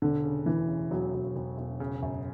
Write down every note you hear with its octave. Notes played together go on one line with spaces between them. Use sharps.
E1 D3
C#3
D2 E3
C#3
E1 F#3
E1
E1
E1
C#3
F#2